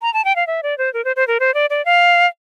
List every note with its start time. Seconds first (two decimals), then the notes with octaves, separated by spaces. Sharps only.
0.02 A#5
0.14 A5
0.25 G5
0.36 F5
0.47 E5
0.63 D5
0.78 C5
0.94 A#4
1.05 C5
1.16 C5
1.28 A#4
1.40 C5
1.54 D5
1.70 D5
1.85 F5